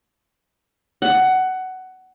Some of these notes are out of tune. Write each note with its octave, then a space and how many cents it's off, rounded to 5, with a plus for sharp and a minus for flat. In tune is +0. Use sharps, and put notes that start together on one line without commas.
F#5 +15